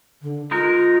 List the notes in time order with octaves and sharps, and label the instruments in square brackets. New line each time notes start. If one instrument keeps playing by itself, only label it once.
[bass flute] D3
[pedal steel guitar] G#3 D#4 A#4 [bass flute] F4